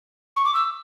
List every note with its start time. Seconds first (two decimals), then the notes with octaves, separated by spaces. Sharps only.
0.36 C#6
0.45 D6
0.54 E6